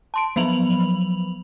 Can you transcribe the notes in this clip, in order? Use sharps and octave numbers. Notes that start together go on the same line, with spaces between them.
A5 C6 D7
F3 F#3 B3 B5 F7 F#7